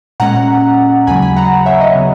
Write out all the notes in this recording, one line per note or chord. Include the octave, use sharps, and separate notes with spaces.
A#2 G#3 C#4 F#5 A#5
D#2 C#3 F#3 G#5 B5
G#5 B5
F#5 A#5
C#5 E5
D#5
C#3 F#3 B3